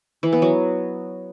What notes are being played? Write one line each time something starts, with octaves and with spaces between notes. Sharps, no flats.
E3
B3
F#3